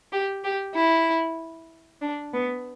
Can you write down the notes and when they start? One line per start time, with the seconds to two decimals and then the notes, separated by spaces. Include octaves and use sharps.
0.12 G4
0.44 G4
0.75 E4
2.01 D4
2.33 B3